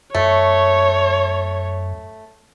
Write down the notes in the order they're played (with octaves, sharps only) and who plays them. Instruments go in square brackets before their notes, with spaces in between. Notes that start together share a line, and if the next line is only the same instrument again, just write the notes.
[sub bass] F#2 [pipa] A3 [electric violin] C#5